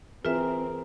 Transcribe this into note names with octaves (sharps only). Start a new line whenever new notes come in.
E3 C4 F4 G#4 A#4 B4 E5